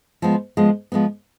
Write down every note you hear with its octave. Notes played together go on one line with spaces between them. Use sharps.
F3 G#3 B3
F3 G#3 B3
F3 G#3 B3